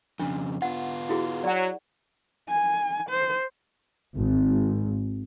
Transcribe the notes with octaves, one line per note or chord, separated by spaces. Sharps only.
F2 C#3 D4
B3 F4 F#5
E4 F#4 G#4
F#3 D5 F#5
G#5
C5
G#1